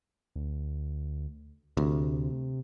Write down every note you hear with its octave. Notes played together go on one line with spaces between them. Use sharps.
D2
D2 C3